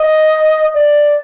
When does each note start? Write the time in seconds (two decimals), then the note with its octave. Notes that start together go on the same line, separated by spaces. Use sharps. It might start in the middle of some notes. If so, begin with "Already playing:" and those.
Already playing: D#5
0.74 D5